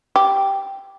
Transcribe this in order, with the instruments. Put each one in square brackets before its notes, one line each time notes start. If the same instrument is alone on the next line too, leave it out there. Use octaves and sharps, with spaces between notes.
[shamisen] G4